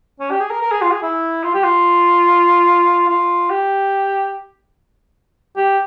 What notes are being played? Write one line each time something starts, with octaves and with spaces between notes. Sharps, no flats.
C#4
G4
G#4
A#4
A#4
G#4
F4
G#4
E4
F4
G4
F4
F4
G4
G4